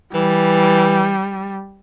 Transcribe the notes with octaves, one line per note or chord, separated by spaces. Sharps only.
E3 G3